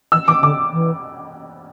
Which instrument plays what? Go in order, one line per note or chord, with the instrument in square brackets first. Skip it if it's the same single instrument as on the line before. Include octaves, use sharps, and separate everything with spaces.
[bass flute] E3 [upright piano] E6
[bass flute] E3 [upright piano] D6
[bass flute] D3 [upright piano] D6
[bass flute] E3